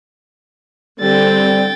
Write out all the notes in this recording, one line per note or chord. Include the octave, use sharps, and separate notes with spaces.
D3 G3 C4 G5 A6